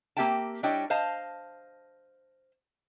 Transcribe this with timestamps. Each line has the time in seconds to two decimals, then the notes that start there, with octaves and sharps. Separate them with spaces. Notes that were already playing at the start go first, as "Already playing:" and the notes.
0.17 A#3 C4 G4 E5 G5 A5
0.63 G3 D4 E4 C#5 D#5 G5
0.90 C5 D#5 F5 A5